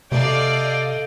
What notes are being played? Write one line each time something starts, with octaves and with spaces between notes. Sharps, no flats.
C3 A3 D5 D#5 F5 G5